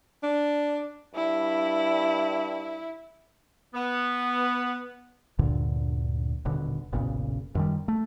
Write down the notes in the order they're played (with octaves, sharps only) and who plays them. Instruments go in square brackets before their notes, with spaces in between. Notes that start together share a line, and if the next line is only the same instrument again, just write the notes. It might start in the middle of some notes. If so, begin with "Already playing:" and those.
[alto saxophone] D4
[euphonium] G2 [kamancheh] E4
[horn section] B3
[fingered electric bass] D2 G2 A#2 D3
D#1 B2 D3
F#1 B1 A#2 C#3
F#2 D#3 G3
A3